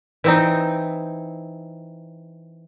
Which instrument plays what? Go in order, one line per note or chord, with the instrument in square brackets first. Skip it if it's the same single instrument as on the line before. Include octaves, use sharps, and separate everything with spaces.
[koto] E3 C4 D#4